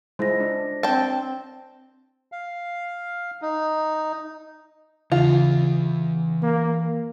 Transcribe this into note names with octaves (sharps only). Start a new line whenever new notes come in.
G#3 E4 F4 C5 A#6
D4
C4 D4 G5 A5
F5
D#4
C#3 E3 F4 G#4
A#3